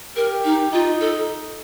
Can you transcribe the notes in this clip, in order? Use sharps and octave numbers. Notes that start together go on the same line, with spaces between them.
G4 A#4
D#4
D#4 F4
A4